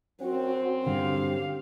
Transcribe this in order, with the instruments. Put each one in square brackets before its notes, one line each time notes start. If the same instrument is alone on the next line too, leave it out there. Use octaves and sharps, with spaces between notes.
[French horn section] F#2 C4 [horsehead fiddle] F#4
[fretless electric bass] G2 D3 [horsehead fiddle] G4 F5